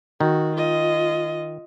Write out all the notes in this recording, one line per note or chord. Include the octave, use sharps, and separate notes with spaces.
D#3 F#4
F4 D#5